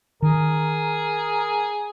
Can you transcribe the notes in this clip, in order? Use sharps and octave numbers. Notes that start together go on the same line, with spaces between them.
D#3 G#4 A#4